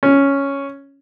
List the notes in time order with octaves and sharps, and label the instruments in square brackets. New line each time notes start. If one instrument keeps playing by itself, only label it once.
[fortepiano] C#4